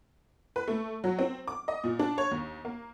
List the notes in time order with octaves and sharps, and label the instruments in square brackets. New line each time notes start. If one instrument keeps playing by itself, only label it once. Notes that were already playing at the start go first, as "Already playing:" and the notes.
[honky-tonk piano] B4
A3
F#3
C4
D6
D#5
A#2
D4
C#5
D#2
A#3